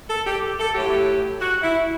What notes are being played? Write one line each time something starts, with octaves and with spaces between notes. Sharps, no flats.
A4
G4
A4
A2 F#3 A3 G4
F#4
E4